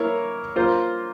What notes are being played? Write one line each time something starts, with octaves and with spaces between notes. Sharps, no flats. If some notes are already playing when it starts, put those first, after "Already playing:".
Already playing: A#3 E4 A#4 C#5
A#3 F4 C5